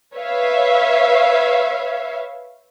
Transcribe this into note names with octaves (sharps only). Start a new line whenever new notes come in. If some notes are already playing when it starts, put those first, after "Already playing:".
B4 C#5 E5 F5